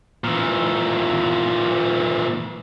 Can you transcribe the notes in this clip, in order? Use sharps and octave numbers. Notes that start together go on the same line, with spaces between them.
A#2 E3